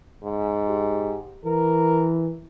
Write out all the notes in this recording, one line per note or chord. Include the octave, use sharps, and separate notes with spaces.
G#2
G4
E3 A#4